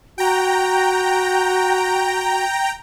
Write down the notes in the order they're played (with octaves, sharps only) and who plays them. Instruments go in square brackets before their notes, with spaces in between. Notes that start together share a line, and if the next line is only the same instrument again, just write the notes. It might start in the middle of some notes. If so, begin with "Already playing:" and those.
[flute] F#4 [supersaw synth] G5 A#5